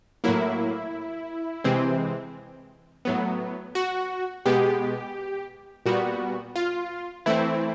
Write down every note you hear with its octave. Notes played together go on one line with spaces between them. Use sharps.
A2 F#3 A#3 E4
C3 E3 G#3 C4
A2 F#3 B3
F#4
B2 G#3 B3 G4
A#2 G3 B3 F#4
F4
E3 A3 C4 E4